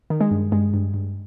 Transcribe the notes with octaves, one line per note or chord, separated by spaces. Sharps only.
D#3
G#3
G2
G2 G#3
G2
G2